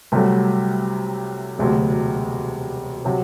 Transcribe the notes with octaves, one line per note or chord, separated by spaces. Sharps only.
C2 C3 F#3 A3
E1 D2 C3 F#3
C3 F#3